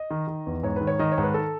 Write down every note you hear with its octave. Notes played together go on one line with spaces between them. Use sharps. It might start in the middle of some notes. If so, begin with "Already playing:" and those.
Already playing: D#5
D#3
D#3
E2
G#2 C#5
D#3 B4
C#5
D#3 D#5
C#5
G#2
B4
A4